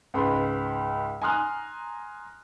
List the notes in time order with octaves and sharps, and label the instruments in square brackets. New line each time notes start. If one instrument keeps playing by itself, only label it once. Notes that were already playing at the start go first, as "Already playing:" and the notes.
[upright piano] C#2 G#2 B4 B5 C6
G#5 A#5 C6 D#6 F6 F#6